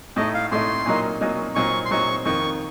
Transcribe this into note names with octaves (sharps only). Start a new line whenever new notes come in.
A2 A3 D#4 D#5
F5
A2 A3 D#4 C6
A#2 F#3 A#3 D#4
A#2 F#3 A#3 D#4
A#2 F#3 C4 D#4 C#6
C6
A#2 F#3 C4 D#4 C#6
F2 D#3 A#3 C#6